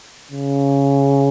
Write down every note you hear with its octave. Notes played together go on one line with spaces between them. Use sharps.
C#3